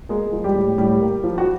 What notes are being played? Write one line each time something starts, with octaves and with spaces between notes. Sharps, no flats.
G#3 A#3 G#4
F3
G3 G4
A2
A2 G3 G4
A#3
F3
F#4